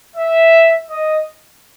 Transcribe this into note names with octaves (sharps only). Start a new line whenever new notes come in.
E5
D#5